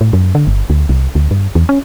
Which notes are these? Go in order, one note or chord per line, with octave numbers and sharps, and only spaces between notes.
A2
F#2
D3
G1
D2
C2
D2
G2
E2
C#4